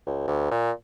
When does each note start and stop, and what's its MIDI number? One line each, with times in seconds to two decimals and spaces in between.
0.07 0.23 37
0.27 0.49 38
0.51 0.71 46